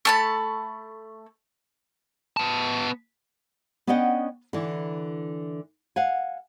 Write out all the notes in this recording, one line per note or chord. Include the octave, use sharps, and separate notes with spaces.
A3 A5 B5
B3 A5
B3 C#4 D4 D#5 F#5 G5
D3 E3
F5 F#5 G#5